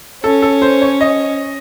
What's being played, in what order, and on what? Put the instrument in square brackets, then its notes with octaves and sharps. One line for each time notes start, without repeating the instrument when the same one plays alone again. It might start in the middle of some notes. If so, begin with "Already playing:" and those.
[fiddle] C#4 [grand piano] A4
[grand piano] A4
C5
C#5
D#5